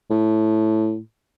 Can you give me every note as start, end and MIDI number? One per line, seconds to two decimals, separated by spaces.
0.10 0.98 45